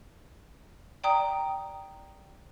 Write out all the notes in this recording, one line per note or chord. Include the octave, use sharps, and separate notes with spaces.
D5 G5 A#5 D#6